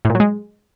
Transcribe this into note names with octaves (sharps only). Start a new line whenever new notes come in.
A2
A#2
F#3
G#3